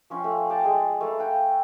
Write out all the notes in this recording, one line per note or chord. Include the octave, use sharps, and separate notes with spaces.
F3 C#4 F4 G5
A3
D5 G5 A5
G#3 G#4
A3 B4 F5
F#5 G5